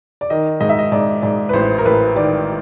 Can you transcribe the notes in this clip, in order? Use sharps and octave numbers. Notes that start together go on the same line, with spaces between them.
D5
D#3 D#5
G#2 D#5
E5
D#5
G#2 D5
G#2 D5
B4
A1 C5
A#4
A1 B4
D#3 D5